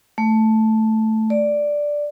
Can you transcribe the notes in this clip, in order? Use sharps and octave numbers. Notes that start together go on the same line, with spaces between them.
A3
D5